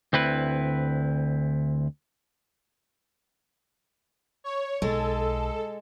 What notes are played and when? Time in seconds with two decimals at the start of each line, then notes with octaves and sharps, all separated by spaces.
0.13 D2 C4 E4 B4
4.44 C#5
4.82 B1 G#3 A4